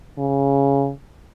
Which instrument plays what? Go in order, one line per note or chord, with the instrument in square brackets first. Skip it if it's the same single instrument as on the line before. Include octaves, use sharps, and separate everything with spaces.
[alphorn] C#3